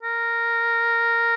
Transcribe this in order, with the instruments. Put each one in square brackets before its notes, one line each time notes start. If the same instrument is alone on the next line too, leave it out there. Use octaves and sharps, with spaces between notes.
[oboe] A#4